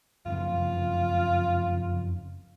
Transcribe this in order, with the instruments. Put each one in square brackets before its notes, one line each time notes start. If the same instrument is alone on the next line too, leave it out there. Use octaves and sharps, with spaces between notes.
[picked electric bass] F#1 F2 C#3 [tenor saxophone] F4